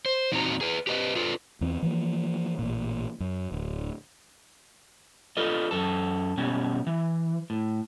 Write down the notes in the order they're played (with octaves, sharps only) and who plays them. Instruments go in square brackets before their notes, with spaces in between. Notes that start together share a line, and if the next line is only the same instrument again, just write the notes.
[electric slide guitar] C5
E2 A#2 C4 D#4 F#4 A#5
G#4 B4
G4 B4 D#5
F4 A4 B4
[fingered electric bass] E2 E3 C4
E3 F3 A#3
A1 A#2
F#2
D1
[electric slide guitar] F4 A4 B4 D#5
F#2 A4
B2 G3 C#4
E3
A2